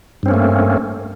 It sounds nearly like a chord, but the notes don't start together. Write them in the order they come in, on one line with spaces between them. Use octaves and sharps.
G2 C4 C#4 A#3 A3